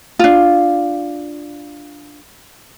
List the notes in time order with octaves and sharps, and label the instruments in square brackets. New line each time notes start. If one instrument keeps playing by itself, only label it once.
[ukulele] D4 F4